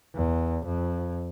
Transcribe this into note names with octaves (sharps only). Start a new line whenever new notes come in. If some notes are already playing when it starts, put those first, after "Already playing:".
E2
F2